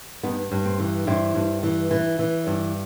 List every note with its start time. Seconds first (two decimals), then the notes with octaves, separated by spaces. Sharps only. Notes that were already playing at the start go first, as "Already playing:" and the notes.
0.23 G2 B3 D#4
0.51 G2
0.65 C4
0.80 E3
1.07 G2 C4 E4
1.35 G2
1.63 E3
1.91 E3
2.19 E3
2.47 G2